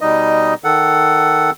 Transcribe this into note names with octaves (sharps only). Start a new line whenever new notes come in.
B2 G3 D#4 D#5
D#3 A4 F#5